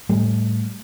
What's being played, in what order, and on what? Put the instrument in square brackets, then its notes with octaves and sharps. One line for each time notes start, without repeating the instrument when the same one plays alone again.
[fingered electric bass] A2 G3 A3